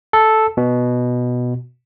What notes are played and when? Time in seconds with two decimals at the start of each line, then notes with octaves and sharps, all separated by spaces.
0.13 A4
0.57 B2